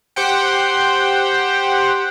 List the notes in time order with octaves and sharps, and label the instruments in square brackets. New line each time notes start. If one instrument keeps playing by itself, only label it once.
[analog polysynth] G4 C5 F#5 G5